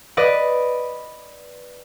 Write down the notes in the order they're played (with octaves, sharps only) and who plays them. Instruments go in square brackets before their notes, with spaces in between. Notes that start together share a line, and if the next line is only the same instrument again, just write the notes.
[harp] B4 D5 D#5